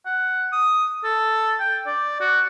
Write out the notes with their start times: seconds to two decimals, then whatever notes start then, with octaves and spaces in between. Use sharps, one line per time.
0.06 F#5
0.53 D#6
1.04 A4
1.60 G5
1.86 D5
2.21 F#4